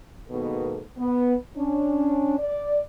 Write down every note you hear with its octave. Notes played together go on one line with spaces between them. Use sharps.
G#2 B2 D#3 A#3 B3 A4
B3
C#4 D4
D5